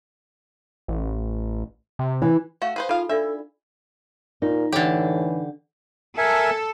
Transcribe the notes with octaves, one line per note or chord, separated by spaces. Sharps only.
A1
C3
E3
A3 F#4 F5
G#4 B4 C5
D#4 F4 G#4 A4 F5 B5
D4 F4 A4 D5 E5
A#2 D#4
A2 D3 E3 G4
A4 A#4 E5 G#5